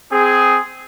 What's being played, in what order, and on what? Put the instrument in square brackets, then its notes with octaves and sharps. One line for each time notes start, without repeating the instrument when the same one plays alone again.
[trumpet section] C4 G#4